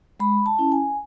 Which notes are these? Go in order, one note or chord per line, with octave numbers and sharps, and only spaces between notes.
G#3 B5
A5
C#4 E4
G#5